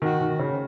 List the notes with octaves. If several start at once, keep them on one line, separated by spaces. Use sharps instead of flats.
D#3 F#4
D#3
C#3